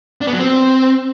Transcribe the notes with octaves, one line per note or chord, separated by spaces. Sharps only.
D4
B3
F#3
C4